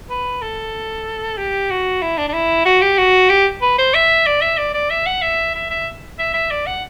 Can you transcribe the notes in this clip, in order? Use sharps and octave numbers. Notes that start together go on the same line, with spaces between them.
B4
A4
G4
F#4
E4
D4
D4
E4
F#4
G4
F#4
G4
B4
C5
E5
D5
E5
D5
D5
E5
F#5
E5
E5
E5
E5
E5
D5
F#5